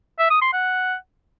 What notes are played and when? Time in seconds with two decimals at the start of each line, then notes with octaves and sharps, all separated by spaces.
0.19 E5
0.31 D#6
0.42 C6
0.53 F#5